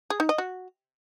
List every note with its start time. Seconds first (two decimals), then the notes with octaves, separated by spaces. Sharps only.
0.10 G#4
0.20 D#4
0.29 D#5
0.38 F#4